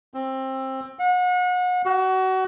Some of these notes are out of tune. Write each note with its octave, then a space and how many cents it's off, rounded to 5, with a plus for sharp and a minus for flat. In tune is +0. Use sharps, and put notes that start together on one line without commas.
C4 +20
F#5 -35
F#4 +30